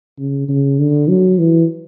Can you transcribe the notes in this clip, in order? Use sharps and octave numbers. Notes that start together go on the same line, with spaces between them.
C#3
C#3
D3
F#3
E3